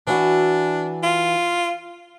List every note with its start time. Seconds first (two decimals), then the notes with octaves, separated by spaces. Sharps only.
0.07 E3 D4 F#4
1.03 F4